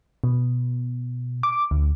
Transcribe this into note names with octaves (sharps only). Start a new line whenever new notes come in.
B2
D6
D2